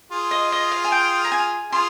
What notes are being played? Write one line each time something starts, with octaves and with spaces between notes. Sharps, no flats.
F4 G#4
D#5
D#5
F5
G#5
G5
A#5
G#5
F4 G#4 C6